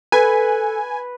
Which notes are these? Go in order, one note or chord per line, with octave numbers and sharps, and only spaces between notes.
A4 B4 G#5